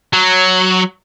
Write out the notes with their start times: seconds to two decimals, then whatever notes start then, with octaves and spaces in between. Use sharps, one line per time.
0.13 F#3